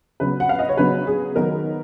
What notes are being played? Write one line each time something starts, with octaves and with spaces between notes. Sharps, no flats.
C#3 F#3 B3 B4
F#5
F5
D#5
C#5
C#3 F#3 B3 B4
G#4
D#3 F#3 B3 D#4 A#4